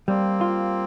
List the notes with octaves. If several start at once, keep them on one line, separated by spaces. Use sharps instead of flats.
G3 A#3 C4
F4